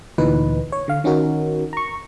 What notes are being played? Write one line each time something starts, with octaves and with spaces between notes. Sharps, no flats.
D2 A#2 E3 D#4 B4
C#5
D3 F5
D#3 C#4 D#4 F#4 A#4
A#5 C#6